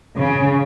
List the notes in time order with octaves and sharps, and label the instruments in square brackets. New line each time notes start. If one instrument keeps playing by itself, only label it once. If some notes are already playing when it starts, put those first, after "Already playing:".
[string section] C#3